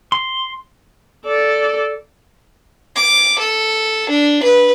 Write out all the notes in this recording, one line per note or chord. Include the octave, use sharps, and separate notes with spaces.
C6
A4 D5
D6
A4
D4
B4